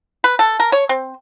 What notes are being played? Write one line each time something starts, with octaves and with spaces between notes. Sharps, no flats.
B4
A4
A#4
C#5
C4